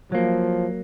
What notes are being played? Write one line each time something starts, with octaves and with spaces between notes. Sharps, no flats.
F3 F#3 A#3